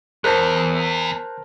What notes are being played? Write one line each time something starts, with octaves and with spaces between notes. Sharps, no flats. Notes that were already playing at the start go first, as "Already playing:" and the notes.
E2 A#4 C5 A5 F#6 G6